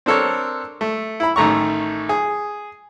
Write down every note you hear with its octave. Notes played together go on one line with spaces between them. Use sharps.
C4 D4 A4 A#4 C#5
A3
E4 B5
A1 D#3 A3 A#5 C#6
G#4